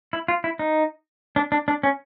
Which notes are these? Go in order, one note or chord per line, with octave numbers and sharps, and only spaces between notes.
E4
F4
E4
D#4
D4
D4
D4
C#4